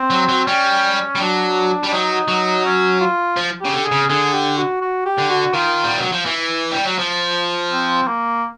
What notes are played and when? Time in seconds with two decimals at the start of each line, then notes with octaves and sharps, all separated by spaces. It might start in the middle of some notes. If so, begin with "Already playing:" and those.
Already playing: C4
0.10 F#3
0.29 F#3
0.47 G3 C#4
1.15 G3
1.20 F#3 D4
1.84 G3
1.87 D4
1.92 F#3 D#4
2.28 F#3
2.64 C#4
3.01 F4
3.37 F3
3.61 C#3 G4
3.73 D3
3.85 G#4
3.91 C#3
4.09 D3 G#4
4.34 G4
4.57 F#4
4.81 F#4
5.05 G4
5.18 D3
5.30 F#4
5.53 D#3 F4
5.84 G3
5.98 F#3
6.12 F3
6.26 E3
6.71 G3
6.85 F#3
6.98 F3
7.72 C4
8.07 A#3